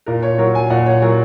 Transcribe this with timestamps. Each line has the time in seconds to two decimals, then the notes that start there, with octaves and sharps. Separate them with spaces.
0.06 A#2 A#4
0.23 C#5
0.38 F#3 A#4
0.55 G#5
0.70 A#2 F#5
0.86 C#5
1.02 F#3 A#4